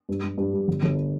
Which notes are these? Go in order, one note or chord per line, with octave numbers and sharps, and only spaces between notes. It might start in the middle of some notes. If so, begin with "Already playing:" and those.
G2
G2
G2
G3
G1
G1